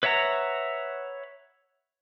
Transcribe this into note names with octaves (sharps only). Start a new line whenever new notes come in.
B4 C#5 E5 F#5 A#5